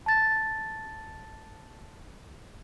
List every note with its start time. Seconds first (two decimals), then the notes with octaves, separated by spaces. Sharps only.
0.06 A5 A6